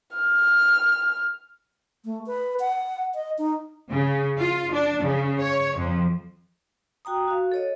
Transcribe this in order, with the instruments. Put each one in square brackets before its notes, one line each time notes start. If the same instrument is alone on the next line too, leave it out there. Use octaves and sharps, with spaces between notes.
[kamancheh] F6
[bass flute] A3
B4
F#5
D#5
D#4
[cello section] C#3
F4
D4
C#3
C#5
F2
[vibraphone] F#4 G5 A#5 D#6
F#4 F5
A4 C#5 D#5